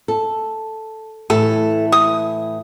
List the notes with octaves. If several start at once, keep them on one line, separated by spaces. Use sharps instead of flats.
A4
A2 E3 A4
D#6